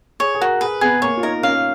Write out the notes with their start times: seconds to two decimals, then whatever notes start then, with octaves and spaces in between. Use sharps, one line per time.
0.20 G#4 C#5
0.35 G#4
0.41 F#4 A#4
0.61 G#4 B4
0.81 B3 G#4
1.02 A#3 C#5
1.17 F4
1.23 D#4 A#4
1.43 C#4 F5